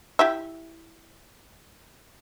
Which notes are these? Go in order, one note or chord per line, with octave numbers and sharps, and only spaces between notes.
E4 G4 E5